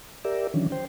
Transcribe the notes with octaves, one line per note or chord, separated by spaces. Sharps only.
G4 A#4 D5 E5
D#3 E3 F#3 C#4 D4
C5 G5